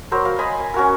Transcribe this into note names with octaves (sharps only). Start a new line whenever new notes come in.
F#3 A#4 C5 B5
F5
D#5 G#5 B5
G#5
C#4 F#4 A#4